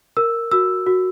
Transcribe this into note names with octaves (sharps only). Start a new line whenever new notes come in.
A#4 E6
F#4 E6
F#4